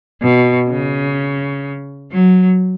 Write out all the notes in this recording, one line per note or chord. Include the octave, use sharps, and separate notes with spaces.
B2
C#3
F#3